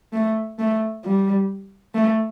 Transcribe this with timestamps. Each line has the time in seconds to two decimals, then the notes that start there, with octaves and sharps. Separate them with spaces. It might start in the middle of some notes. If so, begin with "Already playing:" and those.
0.13 A3
0.59 A3
1.05 G3
1.95 A3